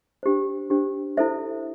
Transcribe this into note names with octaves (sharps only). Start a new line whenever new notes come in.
D4 G4 C5
D4 G4 C5
E4 A4 C5 E5